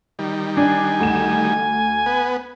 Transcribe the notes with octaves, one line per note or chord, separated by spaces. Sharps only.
D#3 G3
D4 G#5
D2 E7
B3